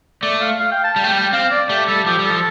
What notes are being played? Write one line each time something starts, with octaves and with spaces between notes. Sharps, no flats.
A3 D5
F5
F5
G5
A5
G3 G5
A3
G5
G3
G5
C4 F5
D5
A3 G4
G3 A4
F3 G4
G3
A4
F3